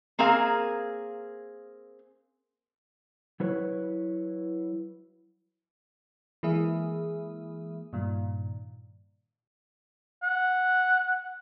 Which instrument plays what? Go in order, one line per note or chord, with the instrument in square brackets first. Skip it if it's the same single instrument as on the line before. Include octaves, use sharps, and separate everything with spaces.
[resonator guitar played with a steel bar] A#3 C4 G#4 A#4 F5
[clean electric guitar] F#3 E4 B4 C#5
[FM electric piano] E3 G#3 A#3 G#4 E5
G2 A#2 D#3
[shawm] F#5